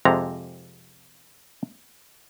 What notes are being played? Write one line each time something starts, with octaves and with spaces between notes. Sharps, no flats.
F2 C3 G#3 A#5